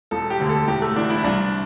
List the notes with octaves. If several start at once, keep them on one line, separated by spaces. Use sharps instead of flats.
E1 A4
G4
D2 D3
A4
E1 G4
A3
E2 E3 D4
E4
C2 D4